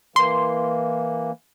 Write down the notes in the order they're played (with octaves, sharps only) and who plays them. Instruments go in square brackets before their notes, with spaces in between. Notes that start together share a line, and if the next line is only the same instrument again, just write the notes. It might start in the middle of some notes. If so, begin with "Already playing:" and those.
[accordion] E3 A#3 [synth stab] C6